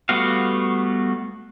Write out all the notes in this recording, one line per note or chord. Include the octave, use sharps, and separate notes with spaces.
G3 A3 B3 F#4 F5